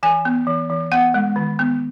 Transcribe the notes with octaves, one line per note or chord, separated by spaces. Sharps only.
E3 G#5
B3
E3
E3
B3 F#5
G#3
D#3
B3